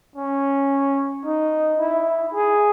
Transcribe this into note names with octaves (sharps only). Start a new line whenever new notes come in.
C#4
D#4
E4
G#4